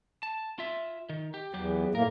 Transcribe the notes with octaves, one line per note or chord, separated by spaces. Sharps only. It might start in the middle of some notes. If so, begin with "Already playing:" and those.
A5
F4 E5
D#3
G4
E2 F#3 G4
A2 A#3 A#4